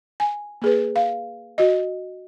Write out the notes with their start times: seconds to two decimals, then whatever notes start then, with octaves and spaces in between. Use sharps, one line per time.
0.20 G#5
0.62 A#3 G#4 B4
0.96 F5
1.58 F#4 D#5